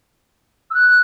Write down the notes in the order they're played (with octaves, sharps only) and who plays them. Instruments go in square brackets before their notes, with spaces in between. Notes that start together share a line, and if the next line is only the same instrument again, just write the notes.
[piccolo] E6
F#6